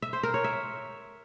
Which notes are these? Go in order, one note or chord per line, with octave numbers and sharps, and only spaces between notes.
E5
C5
A#4
C#5
E5